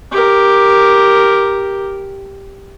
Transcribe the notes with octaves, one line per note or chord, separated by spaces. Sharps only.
G4 A#4